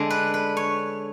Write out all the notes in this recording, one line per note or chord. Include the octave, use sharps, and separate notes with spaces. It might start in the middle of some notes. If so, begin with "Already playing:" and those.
Already playing: D3 G#3 D4
B4
B4
C#5